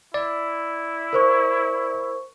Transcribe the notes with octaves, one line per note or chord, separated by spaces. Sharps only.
E4 D5
A#4 C5 C#6